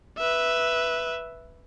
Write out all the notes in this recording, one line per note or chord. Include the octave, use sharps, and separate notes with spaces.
B4 E5